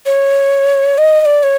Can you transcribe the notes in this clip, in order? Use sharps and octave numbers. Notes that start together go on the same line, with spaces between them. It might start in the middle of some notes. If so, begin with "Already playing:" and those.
C#5
D#5
D#5
D5
C#5